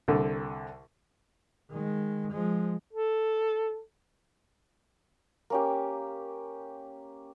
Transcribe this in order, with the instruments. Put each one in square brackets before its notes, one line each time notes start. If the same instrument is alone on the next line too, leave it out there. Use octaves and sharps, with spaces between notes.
[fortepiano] C2 D3
[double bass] D#3 G#3
F3 G#3
[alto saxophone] A4
[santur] A#3 C#4 G4